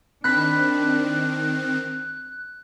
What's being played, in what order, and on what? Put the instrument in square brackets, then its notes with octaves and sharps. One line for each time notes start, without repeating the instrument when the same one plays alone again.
[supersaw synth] D#3 C4 [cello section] D4 [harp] B5 B6 [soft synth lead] F#6